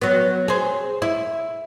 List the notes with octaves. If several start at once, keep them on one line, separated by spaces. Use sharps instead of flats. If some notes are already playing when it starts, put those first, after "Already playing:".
F#3 B3
G#4 C5
E4